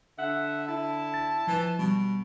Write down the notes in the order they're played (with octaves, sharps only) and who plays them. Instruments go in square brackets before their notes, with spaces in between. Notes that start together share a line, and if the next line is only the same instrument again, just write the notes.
[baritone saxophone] D3 [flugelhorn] E5 [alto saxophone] F#5
[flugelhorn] E4 [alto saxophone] A5
[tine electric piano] A6
[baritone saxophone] E3 [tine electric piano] F3
[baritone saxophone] B2 [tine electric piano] G3